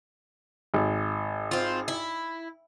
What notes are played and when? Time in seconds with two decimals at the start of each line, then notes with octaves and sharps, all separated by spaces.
0.74 G#1
1.51 C4 F4
1.88 E4